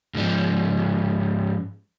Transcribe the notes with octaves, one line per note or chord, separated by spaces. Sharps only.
G#2 F3